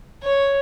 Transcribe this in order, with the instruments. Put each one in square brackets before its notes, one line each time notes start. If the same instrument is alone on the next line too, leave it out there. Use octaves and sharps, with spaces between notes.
[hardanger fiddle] C#5